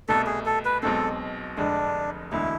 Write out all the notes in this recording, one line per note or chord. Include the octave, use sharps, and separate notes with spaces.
C2 B2 A3 A4
G#4
A4
B4
B1 B2 G#3 C4 A4
F1 F2 D3 G#3 D4
E1 D2 D3 G#3 E4